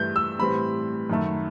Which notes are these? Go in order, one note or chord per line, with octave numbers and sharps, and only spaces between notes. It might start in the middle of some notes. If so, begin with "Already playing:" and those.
Already playing: G2 E3 A3 G6
E6
A2 E3 G3 C4 B5
F#2 D#3 A3